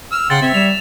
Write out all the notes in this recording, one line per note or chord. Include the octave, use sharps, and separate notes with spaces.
E6 F6
C#3 F#5 G5 C6 A6
C4 C#5 E5
G3 E7 F7